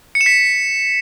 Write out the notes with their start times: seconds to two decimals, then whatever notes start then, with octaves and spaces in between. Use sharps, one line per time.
0.15 C#7
0.21 E7
0.26 B6